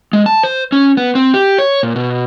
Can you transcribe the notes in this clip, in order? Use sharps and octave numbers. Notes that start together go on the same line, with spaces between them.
G#3
A5
C5
C#4
B3
C4
G4
C#5
A#2
B2